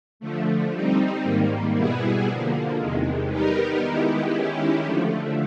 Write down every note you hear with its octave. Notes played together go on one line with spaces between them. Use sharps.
D3 F3 A3
G3 C4 D#4
G#2 D#3 G3 A#3
B2 G3 B3 E4 G#4
D3 F3 A#3
E2 C3 D#3 G#3
G3 B3 D#4 G4 A#4
D#3 G#3 B3 E4 G4
D#3 G#3 C#4 E4 G4
D3 F3 A3